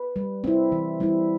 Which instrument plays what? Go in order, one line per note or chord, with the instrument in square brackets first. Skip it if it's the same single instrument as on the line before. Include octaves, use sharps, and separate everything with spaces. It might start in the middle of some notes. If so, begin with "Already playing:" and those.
Already playing: [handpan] B4
G3
C4 E4
E3
G3 C4 E4